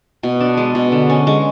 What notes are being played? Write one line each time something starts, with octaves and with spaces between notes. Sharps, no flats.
B2
D4
G#3
B2
D3
C#4
G#3